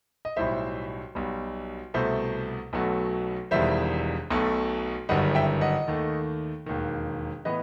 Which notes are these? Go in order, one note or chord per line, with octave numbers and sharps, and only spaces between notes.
D#5
B1 A2 G3 C5 E5
B1 B2 G3
C2 B2 A3 C5 E5
B1 B2 F#3 A3
E1 E2 D#3 G3 C5 E5
B1 B2 A3
G1 F#2 D#3 G3 D#5 F#5
E5 G5
D#5 F#5
D#2 D#3 A3
E1 D#2 D#3
A2 E3 B3 B4 D#5